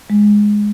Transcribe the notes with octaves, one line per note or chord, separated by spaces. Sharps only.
G#3